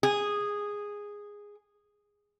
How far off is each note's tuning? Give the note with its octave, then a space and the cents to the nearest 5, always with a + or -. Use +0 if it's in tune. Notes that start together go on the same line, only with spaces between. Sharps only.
G#4 -10